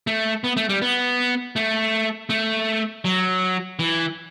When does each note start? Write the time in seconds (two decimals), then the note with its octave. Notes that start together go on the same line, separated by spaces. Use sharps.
0.07 A3
0.44 B3
0.57 A3
0.69 G3
0.82 B3
1.56 A3
2.30 A3
3.05 F#3
3.79 E3